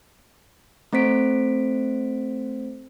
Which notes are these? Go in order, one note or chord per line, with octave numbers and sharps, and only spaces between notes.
A3 C4 C5 B6 D7